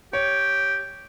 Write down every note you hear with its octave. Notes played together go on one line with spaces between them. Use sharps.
G4 C#5